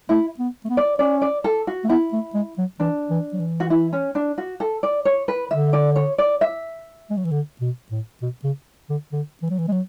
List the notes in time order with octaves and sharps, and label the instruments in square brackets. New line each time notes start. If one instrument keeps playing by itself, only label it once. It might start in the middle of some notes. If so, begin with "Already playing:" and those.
[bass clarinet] A3 [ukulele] E4
[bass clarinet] B3
A3
B3
[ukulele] D5
[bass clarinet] C#4 [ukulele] D5
[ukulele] D5
A4
F#4
[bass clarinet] A3
[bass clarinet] B3 [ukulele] E4
[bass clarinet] A3
G#3
F#3
[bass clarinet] E3 [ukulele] D4
[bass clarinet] E3
F#3
E3
[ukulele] F#4
E4
C#4
D4
F#4
A4
D5
C#5
B4
[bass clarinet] D3 [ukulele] E5
[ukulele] D5
C#5
D5
E5
[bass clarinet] G#3
F#3
E3
D3
B2
A2
B2
C#3
D3
D3
E3
F#3
E3
G#3
F#3